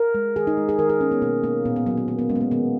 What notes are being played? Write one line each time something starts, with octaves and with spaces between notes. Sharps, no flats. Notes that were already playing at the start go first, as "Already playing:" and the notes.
Already playing: A#4
G#3
D#3 G#4
D#4
G#3
G#4
D#3 A#4
G#4
A#3 C#4
B3
B2 A#3
A#3
A#2 B3
B3
F#3 A#3 B3
B3
D#3 A#3
B3
G#3 C#4
B3
A#3
D#3 B3